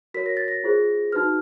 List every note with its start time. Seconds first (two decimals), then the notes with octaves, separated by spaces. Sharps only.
0.14 F#4 A#4 C#5 B6
0.26 A#6
0.37 A6
0.48 A#6
0.64 F4 G#4 C5
1.12 D#4 F#4 B4 F6